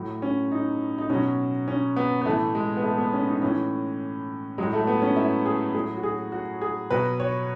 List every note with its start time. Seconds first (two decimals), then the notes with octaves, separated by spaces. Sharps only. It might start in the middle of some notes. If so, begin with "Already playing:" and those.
Already playing: A2 F#3
0.22 C#4
0.52 D#4
0.98 D#4
1.10 B2 F#3 C#4
1.68 C#4
1.96 B3
2.22 B3
2.26 A2 E3 A3
2.55 G#3
2.77 B3
2.83 A3
2.98 B3
3.13 C#4
3.28 D#4
3.42 A2 E3 C#4
4.58 A2 F#3 G#3
4.73 A3
4.87 B3
5.02 C#4
5.16 E4
5.46 G#4
5.74 A2 F#3 G#4
5.97 F#4
6.03 G#4
6.32 F#4
6.61 G#4
6.90 B2 F#3 B4
7.20 C#5